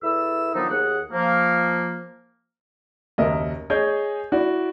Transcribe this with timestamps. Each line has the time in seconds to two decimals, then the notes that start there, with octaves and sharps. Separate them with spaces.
0.03 E2 E4 A4 E6
0.54 D#3 F3 F#3 B3 D4 D#4
0.69 D#2 G#4 F#5
1.12 F3 A#3
3.18 F#1 D#2 A#4 D#5 E5
3.70 G#4 C#5 D#5 G6
4.32 E4 F#4 D5